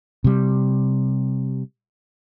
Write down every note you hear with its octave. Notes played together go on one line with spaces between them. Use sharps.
C3 G3